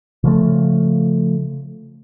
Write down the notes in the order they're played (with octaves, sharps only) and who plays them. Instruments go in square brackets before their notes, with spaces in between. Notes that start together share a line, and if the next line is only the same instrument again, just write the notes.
[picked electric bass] C#3 F3 A3